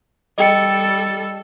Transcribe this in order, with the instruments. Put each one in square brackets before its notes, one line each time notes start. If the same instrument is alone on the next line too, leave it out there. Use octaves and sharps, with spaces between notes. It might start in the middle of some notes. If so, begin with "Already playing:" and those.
[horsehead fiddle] G3 A4 [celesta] D#5 G5 C#7